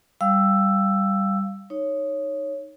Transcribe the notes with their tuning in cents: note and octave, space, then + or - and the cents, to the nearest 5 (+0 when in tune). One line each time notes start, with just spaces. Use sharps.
G3 -5 F5 +0 E6 +10
D#4 +0 C#5 +0